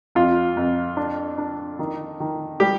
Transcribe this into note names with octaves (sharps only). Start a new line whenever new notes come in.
F2 F4
F2
D4
D4
D#3
D#3
G3 G4